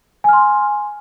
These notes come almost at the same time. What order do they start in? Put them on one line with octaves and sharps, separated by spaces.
G#5 F6 C6